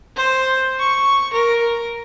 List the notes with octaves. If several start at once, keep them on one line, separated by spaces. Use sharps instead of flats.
C5
C#6
A#4